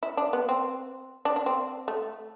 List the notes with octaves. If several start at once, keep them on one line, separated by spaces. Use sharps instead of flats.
E4
D4
B3
C4
D4
D4
C4
A3